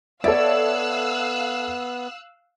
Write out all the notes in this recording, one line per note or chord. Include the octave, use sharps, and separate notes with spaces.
B3 A4 C#5 D5 E5 F5 E6 F#6